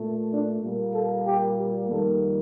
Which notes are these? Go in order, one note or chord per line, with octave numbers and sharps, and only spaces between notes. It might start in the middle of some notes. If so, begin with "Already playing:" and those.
Already playing: A#2 A3
D4
A#2 G3 A#3
A4
G4
G4
F2 D#3 G3 A#3 A4